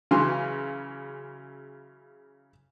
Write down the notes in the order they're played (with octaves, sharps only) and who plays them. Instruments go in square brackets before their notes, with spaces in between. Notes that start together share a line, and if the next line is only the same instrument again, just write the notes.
[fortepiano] C#3 E3 F#3 C6